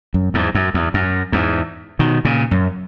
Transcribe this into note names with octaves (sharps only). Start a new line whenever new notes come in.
F#2
E2 G#2
F#2
E2
F#2
E2 G#2
B2 D#3
A#2 C#3
F#2